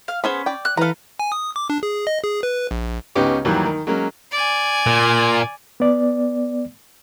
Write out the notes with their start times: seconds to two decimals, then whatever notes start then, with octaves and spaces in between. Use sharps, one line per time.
0.08 F5
0.24 B3 C#4 G#4 C5 B5
0.46 D5 G5
0.65 F#6
0.77 E3 A4 B4 F5 A#5
1.19 G#5
1.32 D#6
1.56 D6
1.70 D4
1.83 G#4
2.07 D#5
2.24 G#4
2.43 B4
2.71 A#1
3.15 C#2 B3 C#4 D#4 G4 D6
3.45 D#2 D#3 E3 F#3 G3
3.65 D#3
3.87 F#3 G#3 A#3 C#4
4.32 D5 G#5
4.86 A#2
5.80 B3 D5